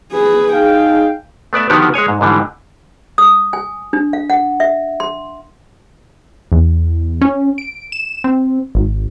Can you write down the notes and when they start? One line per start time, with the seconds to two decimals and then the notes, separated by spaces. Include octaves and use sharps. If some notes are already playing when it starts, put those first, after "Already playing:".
0.12 G#4 B4
0.53 D#4 G#4 F5 G5
1.53 A3 B3 D5 E5
1.70 D3 D#3 F3 B3 F#4 G4
1.94 G#3 G#4 C#5 G#5
2.08 G#2
2.21 G#2 D3 E3 G3
3.18 D#6
3.53 G#5
3.93 D4
4.13 F5
4.30 F#5
4.60 E5
5.00 C6
6.52 E2
7.21 C#4
7.58 D7
7.92 E7
8.24 C4
8.75 G#1